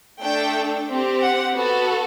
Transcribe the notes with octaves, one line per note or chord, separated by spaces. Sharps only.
A3 D4 A4 G5
C4 G4
F#5
B3 F#4 A4